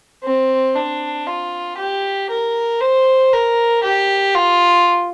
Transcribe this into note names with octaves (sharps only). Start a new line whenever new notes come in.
C4
D4
F4
G4
A#4
C5
A#4
G4
F4